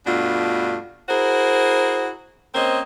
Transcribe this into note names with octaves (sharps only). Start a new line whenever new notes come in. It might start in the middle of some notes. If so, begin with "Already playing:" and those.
G2 B2 A3 D4 F4
E4 F#4 G#4 A#4 C5
A#3 C4 C#4 A#4 C5 D#5